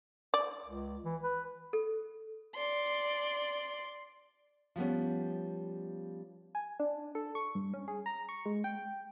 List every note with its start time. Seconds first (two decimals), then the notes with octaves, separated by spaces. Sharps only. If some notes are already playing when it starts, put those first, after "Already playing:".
0.34 D5
0.65 C#2
1.04 E3
1.24 B4
1.73 A4
2.56 D5 C6
4.76 F3 G3 B3 C#4
6.55 G#5
6.79 D4
7.15 A4
7.35 C#6
7.55 G2
7.74 C#4
7.88 G#4
8.06 A#5
8.29 C#6
8.46 G#3
8.64 G5